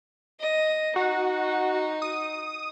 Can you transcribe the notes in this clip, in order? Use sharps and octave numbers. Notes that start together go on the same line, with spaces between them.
D#5
D#4 F#4
D#6